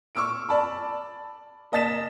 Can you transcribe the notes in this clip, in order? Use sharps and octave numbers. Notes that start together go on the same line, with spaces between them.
C#6 D6 E6 F6 D7
D5 A5 B5
A#3 D#5 A5 A6 B6 E7